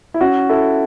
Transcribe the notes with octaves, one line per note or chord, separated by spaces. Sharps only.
E4
C#4 F#4
E4 A4